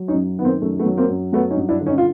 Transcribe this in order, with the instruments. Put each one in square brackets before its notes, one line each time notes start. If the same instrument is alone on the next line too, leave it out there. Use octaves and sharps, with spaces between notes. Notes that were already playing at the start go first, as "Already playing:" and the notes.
Already playing: [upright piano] F#3
C#4 D#4
F#2
D#3 B3
A#3 C4
F#2 A3
A3 B3
F#3
A#3 C4
F#2
F#3 A3 B3
C#4 D#4
G2
D4 E4
D3
C#4 D#4
F4